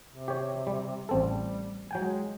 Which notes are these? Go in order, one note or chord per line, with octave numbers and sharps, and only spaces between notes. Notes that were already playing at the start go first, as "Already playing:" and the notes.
C3
G4 C#5
G3
A1 G3 C4 A4
F#3 G#3 G5 G#5